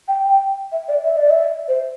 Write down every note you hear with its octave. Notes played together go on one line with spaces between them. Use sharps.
G5
G5
E5
D5
E5
D5
E5
C5